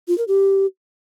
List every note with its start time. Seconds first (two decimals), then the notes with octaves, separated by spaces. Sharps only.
0.08 F4
0.18 A#4
0.28 G4